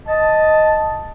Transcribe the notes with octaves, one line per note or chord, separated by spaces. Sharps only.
D#5 A5